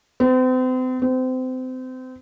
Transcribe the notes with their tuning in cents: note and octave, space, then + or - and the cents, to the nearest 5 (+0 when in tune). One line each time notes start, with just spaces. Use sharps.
C4 -40
C4 -30